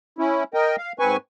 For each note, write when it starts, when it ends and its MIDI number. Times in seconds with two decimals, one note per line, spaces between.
0.19 0.44 61
0.19 0.44 64
0.54 0.76 70
0.54 0.76 75
0.54 0.76 79
0.78 0.92 77
0.99 1.17 44
0.99 1.17 60
0.99 1.17 71
0.99 1.17 80
0.99 1.17 85